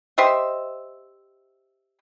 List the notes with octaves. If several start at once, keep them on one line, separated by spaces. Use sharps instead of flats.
G4 C5 D#5 E5